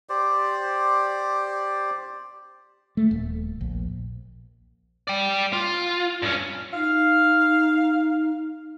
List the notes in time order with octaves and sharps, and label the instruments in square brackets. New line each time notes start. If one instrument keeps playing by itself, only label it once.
[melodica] G4 C5 D5
[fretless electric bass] A3
D#1
A#1
[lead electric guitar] D5 G5
F4
G2 C#4
[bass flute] D#4 [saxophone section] F5